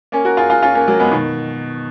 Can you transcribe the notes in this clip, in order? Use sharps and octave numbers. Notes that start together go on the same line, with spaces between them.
A#3 C#4
F#4 A#4
F4 G#4
F4 G#4
C#4 F4
A#3 C#4
F#3 A#3
G#3 B3
B2 D#3